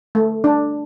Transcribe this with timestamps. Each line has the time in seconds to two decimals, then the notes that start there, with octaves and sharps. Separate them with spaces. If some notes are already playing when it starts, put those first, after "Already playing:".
0.15 A3
0.44 D4